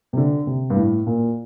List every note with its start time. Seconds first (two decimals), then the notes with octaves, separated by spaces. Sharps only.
0.13 C3
0.17 D3
0.47 C3
0.70 G2
0.76 A2
1.07 A#2